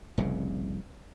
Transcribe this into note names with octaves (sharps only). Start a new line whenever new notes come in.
F1 C2 A#2 C#3